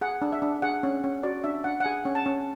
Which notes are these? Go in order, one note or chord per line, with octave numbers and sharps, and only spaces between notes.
G#4 F#5
D4
E5
D4
G#4 F#5
C#4
C#4
F#4 D5
D4 E5
D4 F#5
F#5
G#4 G#5
C#4
A5
C#4